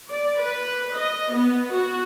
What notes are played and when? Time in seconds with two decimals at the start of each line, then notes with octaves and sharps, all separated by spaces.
0.12 D5
0.41 B4
0.96 D#5
1.34 B3
1.74 F#4